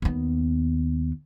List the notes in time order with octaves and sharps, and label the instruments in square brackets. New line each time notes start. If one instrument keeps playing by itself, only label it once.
[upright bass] D#2 B3